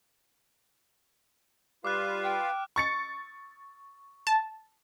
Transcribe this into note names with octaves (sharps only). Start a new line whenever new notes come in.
G3 F4 B4 F5 D6 F6 F#6
G5
C#6 A6 C#7
A5